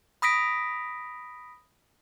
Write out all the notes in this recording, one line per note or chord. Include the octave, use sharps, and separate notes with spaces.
B5 D#6 A#6 B6 D7